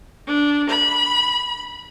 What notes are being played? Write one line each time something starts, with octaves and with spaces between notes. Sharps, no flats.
D4
B5